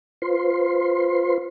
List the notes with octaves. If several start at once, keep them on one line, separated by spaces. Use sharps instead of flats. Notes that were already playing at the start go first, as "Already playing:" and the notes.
F4 B4 C5 C6